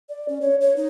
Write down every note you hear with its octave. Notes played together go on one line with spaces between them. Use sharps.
D5
C#4
C#5
C#5
D#4